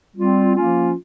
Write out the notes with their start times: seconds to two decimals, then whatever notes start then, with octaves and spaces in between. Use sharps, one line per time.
0.15 G3 C4 F4
0.54 F3 A#3 C#4 F4